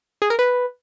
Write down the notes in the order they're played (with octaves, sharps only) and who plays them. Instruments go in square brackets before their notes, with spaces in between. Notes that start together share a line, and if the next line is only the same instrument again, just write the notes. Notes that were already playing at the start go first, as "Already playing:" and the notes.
[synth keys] G#4
A#4
B4